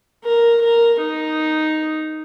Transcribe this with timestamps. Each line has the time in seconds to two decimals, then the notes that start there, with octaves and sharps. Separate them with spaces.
0.24 A#4
0.61 A#4
1.00 D#4